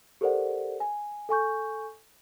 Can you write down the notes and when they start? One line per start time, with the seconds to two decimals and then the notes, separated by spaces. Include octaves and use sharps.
0.21 G4 A4 A#4 C5 D5 F#5
0.80 G#5
1.29 A4 G#5 C#6 G6